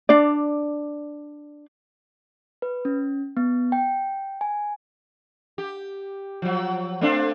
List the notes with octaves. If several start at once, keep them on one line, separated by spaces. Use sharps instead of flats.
D4 D5
B4
C#4
B3
G5
G#5
G4
F3 F#3
A3 C4 D4